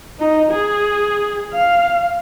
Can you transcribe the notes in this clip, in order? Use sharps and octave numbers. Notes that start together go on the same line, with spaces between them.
D#4
G#4
F5